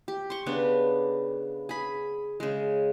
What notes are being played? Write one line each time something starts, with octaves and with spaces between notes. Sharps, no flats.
G4
C6 C#6
C#3 B3 D4
G#4 B5
C#3 G#3